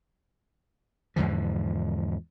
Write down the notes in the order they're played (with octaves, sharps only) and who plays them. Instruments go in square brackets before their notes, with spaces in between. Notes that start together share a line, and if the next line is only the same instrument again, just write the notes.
[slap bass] E2 G#2 D3 F3